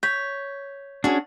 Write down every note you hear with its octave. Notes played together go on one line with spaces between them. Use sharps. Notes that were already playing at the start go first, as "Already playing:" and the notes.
C#5 G6 B6
C#4 D4 F#4 G#4